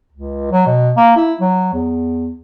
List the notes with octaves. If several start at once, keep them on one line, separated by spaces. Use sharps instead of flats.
C#2
F#3
B2
A#3
E4
F#3
E2